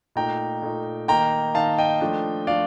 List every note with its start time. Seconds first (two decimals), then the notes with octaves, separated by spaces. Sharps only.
0.16 A#2 A3 D#4 G5 A#5
0.62 A#2 A3 D#4
1.08 D#3 A#3 D#4 G5 A#5
1.55 D#3 A#3 D#4 F5 A5
1.78 D#5 G5
2.01 F3 A3 D4
2.47 F3 A3 D4 D5 F5